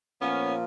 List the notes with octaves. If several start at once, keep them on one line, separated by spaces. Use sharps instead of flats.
A#2 F3 A#3 B3 C#4